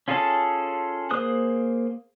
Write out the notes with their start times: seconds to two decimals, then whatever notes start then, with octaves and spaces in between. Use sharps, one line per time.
0.08 C#4 F4 G#4 A4 A5
1.11 A#3 G#4 C5 D#6 F#6